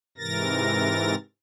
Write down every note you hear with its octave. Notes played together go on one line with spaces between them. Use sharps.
G#2 C3 E3 A#4 A6 A#6